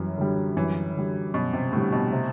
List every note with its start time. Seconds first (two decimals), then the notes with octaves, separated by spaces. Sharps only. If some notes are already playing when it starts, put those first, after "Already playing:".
Already playing: F#2 E3 G3
0.18 D3 G3
0.57 F#2 E3
0.95 D3 G3
1.33 F#2 B2
1.53 C3
1.73 A2 D3 G3
1.92 B2
2.12 C3